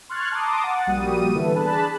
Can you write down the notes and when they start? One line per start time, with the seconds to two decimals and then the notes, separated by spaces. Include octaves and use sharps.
0.09 C6 C#6 F6 F#6 G#6 A6
0.32 A5 A#5 C6 D6 D#6
0.64 F#5 A6
0.87 A#1 G3 A#3 F#4 D#6 D#7
1.35 D3 E3 B3 E4 A4 B4
1.55 D4 G#4 A5 B5 F#6